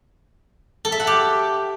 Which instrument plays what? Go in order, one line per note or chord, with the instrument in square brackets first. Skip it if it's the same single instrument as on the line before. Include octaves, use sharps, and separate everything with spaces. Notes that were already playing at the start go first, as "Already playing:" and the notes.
[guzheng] A4
E5
F#5
G4